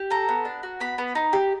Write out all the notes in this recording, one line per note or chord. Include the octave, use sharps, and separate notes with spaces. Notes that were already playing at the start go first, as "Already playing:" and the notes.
Already playing: G4
A4 A#5
B3
D4
F#4
B3 B5
B3
D#4
G4